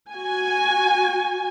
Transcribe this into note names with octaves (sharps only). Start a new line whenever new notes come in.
F#4 G#5